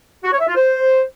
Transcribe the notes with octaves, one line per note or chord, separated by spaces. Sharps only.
F#4
C#5
E5
F4
C5